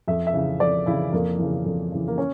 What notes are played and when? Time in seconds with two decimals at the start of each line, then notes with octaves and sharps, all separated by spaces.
0.08 F2 E5
0.27 E5
0.34 C#3 E3
0.60 F2 D5
0.86 C#3 E3 E4
1.12 F2 A#3
1.38 C#3 E3
1.65 F2
1.92 C#3 E3
2.08 A#3
2.18 C#4